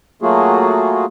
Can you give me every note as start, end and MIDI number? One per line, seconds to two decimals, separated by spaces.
0.22 1.05 54
0.22 1.05 57
0.22 1.05 58
0.22 1.05 65
0.22 1.05 66
0.22 1.05 68